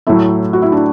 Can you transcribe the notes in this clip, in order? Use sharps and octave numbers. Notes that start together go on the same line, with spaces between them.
A2 F#3 A3 E4
F#4
E4
D4